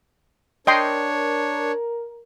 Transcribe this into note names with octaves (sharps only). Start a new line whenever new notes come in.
D4 A#4 C#5 D#5 G5 C6